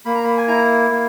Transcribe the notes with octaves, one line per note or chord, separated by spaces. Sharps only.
A#3 B5
A#5
B5
G#5
E4 A#5
A#3